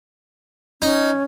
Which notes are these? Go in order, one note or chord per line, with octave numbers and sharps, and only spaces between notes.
C#4 D#4